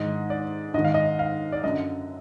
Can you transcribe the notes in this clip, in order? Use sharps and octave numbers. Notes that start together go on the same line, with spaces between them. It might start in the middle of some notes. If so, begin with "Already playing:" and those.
Already playing: G#2 D#3 D#5
D5
G#2 D#3 D#5
F5
D#5
F5
D5
F#2 D3 D#5